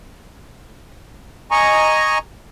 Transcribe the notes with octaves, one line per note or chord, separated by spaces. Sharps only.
D#5 G#5 A#5 C#6